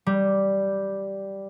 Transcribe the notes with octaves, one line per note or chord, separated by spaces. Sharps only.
G3